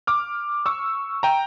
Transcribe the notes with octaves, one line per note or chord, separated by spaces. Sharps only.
D6 F6
C#6 E6
G5 A#5